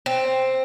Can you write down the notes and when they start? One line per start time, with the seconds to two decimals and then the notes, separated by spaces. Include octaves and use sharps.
0.06 C4